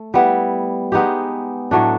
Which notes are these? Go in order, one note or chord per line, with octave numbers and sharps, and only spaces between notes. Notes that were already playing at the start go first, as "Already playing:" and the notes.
Already playing: A3
G3 B3 E4
G#3 B3 D#4 G4
A2 F#3 A3 D4